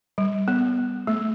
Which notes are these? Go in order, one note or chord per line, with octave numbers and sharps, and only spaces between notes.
G3
B3
A3